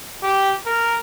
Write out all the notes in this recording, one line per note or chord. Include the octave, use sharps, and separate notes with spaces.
G4
A#4